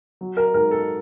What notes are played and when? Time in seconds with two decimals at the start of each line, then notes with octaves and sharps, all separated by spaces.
0.21 F#3
0.37 A#4
0.54 G#2 A#4
0.71 A4